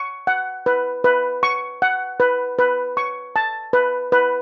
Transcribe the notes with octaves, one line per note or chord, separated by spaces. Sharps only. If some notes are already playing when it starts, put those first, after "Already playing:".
Already playing: C#6
F#5
B4
B4
C#6
F#5
B4
B4
C#6
A5
B4
B4